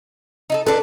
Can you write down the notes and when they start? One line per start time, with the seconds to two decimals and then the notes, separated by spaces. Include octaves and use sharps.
0.50 D#4 E4 A4
0.67 D4 A4 B4